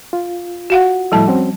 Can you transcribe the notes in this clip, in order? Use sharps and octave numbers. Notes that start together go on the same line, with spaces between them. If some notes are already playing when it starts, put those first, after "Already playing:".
F4
F#4 F5 F#5
A2 F3 G3 E4 A4 A5
C4 C#4 F#4